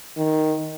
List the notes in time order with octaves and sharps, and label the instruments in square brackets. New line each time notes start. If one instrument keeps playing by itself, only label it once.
[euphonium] D#3